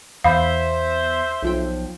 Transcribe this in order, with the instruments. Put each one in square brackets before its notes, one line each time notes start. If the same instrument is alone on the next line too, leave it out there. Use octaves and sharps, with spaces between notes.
[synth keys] E2 [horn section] C5 E5 [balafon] F5 B5
[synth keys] B1 F3 G5